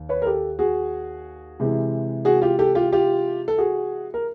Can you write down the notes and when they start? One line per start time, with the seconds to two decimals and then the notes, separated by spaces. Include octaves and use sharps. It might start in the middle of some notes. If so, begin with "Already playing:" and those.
Already playing: D#2
0.09 B4 C#5
0.22 A#4
0.25 G4 A4
0.59 F#4 G#4
1.60 C3 E3 G#3
2.25 F#4 G#4
2.42 F4 G4
2.59 G4 A4
2.75 F4 G4
2.92 F4 G4
3.48 A4
3.58 F#4 G#4
4.14 A#4